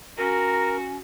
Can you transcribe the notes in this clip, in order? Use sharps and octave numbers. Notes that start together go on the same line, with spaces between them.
C#4 F#4 A#4 A#5